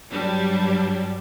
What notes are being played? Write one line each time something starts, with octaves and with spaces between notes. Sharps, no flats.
G2 F#3 G3 D4